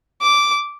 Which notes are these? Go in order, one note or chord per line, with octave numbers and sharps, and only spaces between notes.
D6